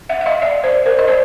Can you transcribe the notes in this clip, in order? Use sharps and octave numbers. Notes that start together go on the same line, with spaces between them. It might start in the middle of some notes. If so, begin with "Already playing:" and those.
E5 F#5
E5
D#5 F5
D5 E5
C5 D5
A#4 C5
D#5
C5 D5